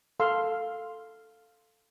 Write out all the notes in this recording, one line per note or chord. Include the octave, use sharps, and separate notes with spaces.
A4 F5 C6 E6